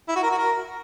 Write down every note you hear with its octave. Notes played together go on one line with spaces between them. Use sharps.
E4
F#4
A#4
F#4
A#4